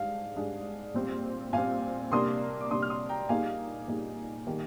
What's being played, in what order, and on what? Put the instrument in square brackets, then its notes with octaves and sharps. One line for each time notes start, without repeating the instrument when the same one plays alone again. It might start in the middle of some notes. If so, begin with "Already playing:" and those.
Already playing: [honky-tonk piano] G#2 G3 D4 G#4 [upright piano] F5
[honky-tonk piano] G#2 G3 D4 G#4
A#2 G3 C4
[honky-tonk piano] A#2 G3 C4 [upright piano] F5 G#5
[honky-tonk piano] C3 G3 A#3 D4 [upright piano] C6 D#6
[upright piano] D6
[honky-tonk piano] C3 G3 A#3 D4 [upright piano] C6 D#6
[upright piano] F6
C6 D#6
G5 A#5
[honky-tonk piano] A#2 G3 A#3 D#4 G#4 [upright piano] F5 G#5
[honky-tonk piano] A#2 G3 A#3 D#4 G#4
D#3 G3 A#3